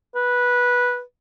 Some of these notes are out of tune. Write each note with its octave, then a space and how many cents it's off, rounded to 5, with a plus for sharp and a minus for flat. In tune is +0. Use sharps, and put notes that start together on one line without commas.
B4 -10